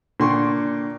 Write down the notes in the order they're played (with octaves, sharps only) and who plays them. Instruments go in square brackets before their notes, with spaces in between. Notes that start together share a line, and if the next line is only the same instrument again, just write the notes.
[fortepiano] A#2 D3 G5 C6 C#6